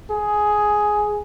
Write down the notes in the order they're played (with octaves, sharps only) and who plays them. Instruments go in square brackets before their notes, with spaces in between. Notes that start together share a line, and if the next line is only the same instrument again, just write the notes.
[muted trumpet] G#4